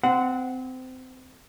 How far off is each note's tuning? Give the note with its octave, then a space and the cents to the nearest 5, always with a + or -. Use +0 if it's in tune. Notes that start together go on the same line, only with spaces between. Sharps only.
C4 -25 F#5 +0